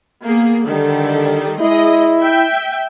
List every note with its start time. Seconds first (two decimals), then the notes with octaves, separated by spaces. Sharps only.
0.24 A#3 B3 G#4
0.68 D3 D#3 G3 A4
1.61 G#3 E4 G#4 D#5
2.20 E5 G5